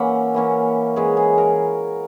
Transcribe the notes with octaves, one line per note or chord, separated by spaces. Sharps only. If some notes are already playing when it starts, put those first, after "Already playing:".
Already playing: E3 A#3 C#4 E5 F#5
E3 A#3 C#4
E3 G#3 C#4 G#4
G#4
A#4